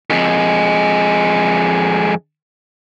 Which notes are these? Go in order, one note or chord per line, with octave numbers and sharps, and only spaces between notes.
F2 G#3